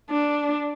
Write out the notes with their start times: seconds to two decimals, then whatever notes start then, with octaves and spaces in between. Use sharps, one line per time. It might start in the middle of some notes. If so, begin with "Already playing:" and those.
0.11 D4